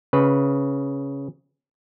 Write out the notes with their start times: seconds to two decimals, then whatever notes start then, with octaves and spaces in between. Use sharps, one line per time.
0.13 C#3 B4